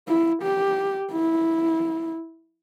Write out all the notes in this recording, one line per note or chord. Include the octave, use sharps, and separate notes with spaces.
E4
G4
E4